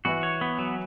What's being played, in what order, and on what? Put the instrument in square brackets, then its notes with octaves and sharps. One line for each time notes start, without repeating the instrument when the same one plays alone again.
[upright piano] E3 E4 [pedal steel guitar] F#4
[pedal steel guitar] C#5
B3
F#3